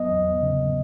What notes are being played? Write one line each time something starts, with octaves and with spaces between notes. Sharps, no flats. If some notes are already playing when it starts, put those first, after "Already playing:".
Already playing: F#3 B3 D#5
E2
C#3